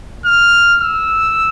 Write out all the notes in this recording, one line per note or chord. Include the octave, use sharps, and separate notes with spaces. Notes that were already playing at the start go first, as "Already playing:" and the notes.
F6
E6